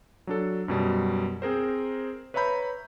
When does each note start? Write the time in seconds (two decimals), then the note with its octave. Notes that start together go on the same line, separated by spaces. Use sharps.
0.27 F#3 D4 A4
0.68 F#2 B2 G3
1.42 C4 G#4 A#4 C5
2.34 B4 C#5 E5 A#5 B5 G6